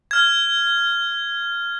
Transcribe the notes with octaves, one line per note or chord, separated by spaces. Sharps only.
F6 G#6